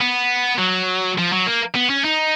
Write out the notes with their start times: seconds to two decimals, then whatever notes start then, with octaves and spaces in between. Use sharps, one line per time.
0.01 B3
0.59 F#3
1.18 F3
1.32 F#3
1.47 A#3
1.75 B3
1.90 C#4
2.04 D#4